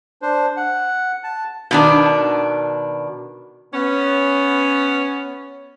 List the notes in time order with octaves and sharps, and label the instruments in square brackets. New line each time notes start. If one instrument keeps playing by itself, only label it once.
[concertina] D4 C5
F#5
A5
[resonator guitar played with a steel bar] B2 D#3 D4
[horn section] B3 C#4